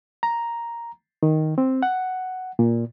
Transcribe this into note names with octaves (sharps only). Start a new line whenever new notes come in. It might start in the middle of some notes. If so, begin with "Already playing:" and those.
A#5
D#3
C4
F#5
A#2